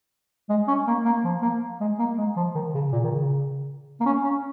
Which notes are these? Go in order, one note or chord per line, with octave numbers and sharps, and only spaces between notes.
G#3
C#4
A#3
A#3
F3
A#3
G#3
A#3
G#3
F3
D#3
C#3
A#2
D#3
C#3
A#3
C#4
C#4